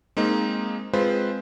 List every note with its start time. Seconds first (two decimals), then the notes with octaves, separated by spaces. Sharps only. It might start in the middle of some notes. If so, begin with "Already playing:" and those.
0.17 G#3 A#3 C4 D#4
0.93 G#3 C4 F4 B4 C5